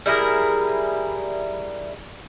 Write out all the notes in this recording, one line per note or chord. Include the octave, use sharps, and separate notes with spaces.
G3 E4 G#4 A#4